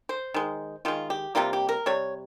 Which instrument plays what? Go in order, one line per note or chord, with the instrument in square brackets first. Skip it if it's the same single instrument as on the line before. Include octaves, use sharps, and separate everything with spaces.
[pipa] C5
D#3 G#3
D#3 G#3 F4
G4
C3 G3 A#3 F4
G4
A#4
C3 G3 C#5